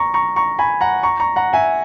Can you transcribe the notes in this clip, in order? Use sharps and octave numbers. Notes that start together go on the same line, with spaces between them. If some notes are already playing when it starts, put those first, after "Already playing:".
Already playing: A#5 C#6
A#5 C#6
A#5 C#6
G#5 B5
F#5 A#5
A#5 C#6
A#5 C#6
F#5 A#5
E5 G#5